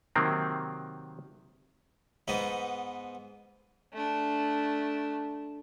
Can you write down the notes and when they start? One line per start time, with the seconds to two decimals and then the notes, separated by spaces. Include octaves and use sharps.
0.16 C3 D#3 F#3 A#3 C4
2.28 G#2 B3 D#4
3.93 A3 D4